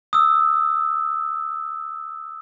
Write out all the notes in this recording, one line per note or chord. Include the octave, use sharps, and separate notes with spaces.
D#6 E6